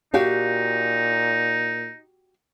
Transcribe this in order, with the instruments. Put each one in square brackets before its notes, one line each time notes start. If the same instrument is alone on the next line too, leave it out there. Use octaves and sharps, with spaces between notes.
[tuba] A#2 [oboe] D#4 [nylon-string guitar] F#4 G4 F5